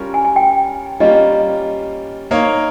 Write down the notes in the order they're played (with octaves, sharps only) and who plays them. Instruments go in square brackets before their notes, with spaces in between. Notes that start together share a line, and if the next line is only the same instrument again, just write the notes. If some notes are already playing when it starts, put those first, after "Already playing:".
Already playing: [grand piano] G3 C#4 F4 A#4 C#5
[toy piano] G#5
G#5
G5
[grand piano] G3 A#3 C#4 F4 [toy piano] D#5
[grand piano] A#3 D#4 A#4 C#5 F5